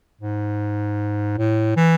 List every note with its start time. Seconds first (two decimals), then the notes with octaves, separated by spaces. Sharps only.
0.21 G#2
1.38 A2
1.76 E3